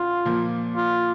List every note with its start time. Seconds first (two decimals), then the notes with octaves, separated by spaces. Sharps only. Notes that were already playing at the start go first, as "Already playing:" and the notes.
Already playing: E2 C#3 F4
0.25 A#2 F3 A#3
0.76 F4